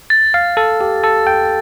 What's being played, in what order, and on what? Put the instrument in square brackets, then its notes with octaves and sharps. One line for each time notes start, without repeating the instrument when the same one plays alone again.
[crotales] A6
[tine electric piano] F5
[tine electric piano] A4 [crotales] A6
[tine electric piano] G4
[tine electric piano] A4 [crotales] A6
[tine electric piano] G5